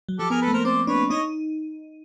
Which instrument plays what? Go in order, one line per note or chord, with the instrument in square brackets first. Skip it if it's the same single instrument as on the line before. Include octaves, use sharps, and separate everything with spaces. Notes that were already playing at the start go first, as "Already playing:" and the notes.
[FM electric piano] F#3
[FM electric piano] F3 [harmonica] G4 A4
[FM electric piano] B3 [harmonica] G#4 A#4
[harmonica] A4 B4
[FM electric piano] A3
[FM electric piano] A#3 [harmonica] A#4 C5
[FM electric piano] C4 [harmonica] C5 D5
[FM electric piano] D4 [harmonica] B4 C#5
[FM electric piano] D#4 [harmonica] C#5 D#5